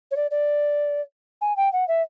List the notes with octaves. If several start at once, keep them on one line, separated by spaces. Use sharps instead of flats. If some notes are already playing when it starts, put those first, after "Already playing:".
C#5
D5
D5
G#5
G5
F#5
E5